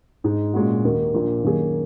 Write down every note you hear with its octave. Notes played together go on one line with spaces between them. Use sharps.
G#2 G#3 D#4
A#2 G#3 C#4 F#4
D#2 D#3 A#3 F#4
A#1 A#2 A#3
F#2 D#3 A#3 C#4 G#4